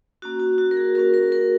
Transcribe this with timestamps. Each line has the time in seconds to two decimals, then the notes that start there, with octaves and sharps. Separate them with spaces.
0.22 A#3 C#4 F#4
0.40 F#4
0.58 F#4
0.71 A#4
0.77 G#4
0.95 A#3 C#4 F#4 A#4
1.14 A#4
1.32 A#4